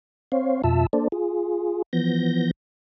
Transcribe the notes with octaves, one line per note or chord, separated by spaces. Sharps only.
C4 C5 C#5 F5
F2 B2 F4 E5 A5 E6
A#3 D4 A4 C5 D5
F4 G#4
E3 F3 B3 G6 A#6